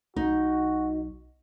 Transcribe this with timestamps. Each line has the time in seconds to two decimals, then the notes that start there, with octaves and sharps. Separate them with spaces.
0.16 B1 D#4 F#4